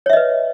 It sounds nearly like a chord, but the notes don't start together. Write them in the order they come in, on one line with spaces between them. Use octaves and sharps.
C#5 E5 D#5 B4